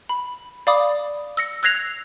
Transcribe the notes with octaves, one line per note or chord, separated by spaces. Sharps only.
B5
D5 F5 B5 D6 D#6
E6 A#6 C#7
E6 F#6 G#6 A#6 C7 F7